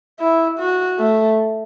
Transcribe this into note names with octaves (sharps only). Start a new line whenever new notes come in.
E4
F#4
A3